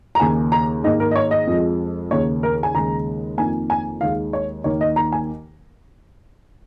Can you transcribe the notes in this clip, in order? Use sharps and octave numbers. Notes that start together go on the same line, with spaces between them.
A#5
D#2 C#3 A#3 G#5
A#5
G#2 D#3 A#3 D#5
A#4
D#5
C#5
D#5
F2 F3 G#3
D#2 C#3 A#3 C#5
A#4
G#5
D#2 C#3 G#3 A#5
F2 D#3 A#3 G#5
G#5
D#2 D#3 G#3 F5
C#5
D#2 D#3 A#3 C#5
D#5
A#5
G#5